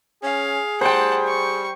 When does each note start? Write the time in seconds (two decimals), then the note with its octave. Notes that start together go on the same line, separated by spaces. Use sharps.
0.23 C#4 G#4 F5
0.81 G3 C5 F#5 G5 A5
1.27 C#6